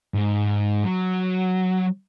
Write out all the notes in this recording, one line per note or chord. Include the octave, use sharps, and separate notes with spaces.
G#2
F#3